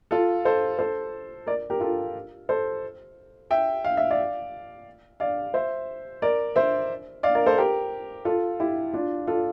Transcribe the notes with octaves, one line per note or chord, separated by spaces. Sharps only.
F4 A4
A4 C5
A4 C5
A#4 D5
G4 A#4
F4 A4
A4 C5
E5 G5
F5
E5
D5 F5
D5 F5
C5 E5
A#4 D5
C5 E5
D5 F5
A#4 D5
A4 C5
G4 A#4
F4 A4
E4 G4
D4 F4
F4 A4